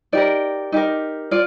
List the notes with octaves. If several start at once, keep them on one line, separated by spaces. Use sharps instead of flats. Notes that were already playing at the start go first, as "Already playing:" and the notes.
D#4 G4 A#4 D5
D#4 G4 A#4
F4 D5